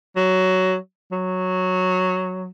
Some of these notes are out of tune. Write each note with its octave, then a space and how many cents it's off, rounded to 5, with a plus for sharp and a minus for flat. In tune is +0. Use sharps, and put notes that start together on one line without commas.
F#3 +10
F#3 -5